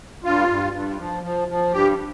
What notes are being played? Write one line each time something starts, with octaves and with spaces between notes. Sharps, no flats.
G2 F4
G2
G2
F3
F3
F3
G2 G4